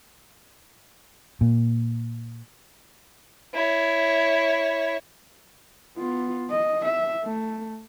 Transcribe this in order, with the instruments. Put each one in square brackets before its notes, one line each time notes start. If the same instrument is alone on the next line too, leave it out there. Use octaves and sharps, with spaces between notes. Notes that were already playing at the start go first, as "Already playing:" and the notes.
[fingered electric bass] A#2
[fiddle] E4 C#5
[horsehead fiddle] B3 F4
D#5
E5
A3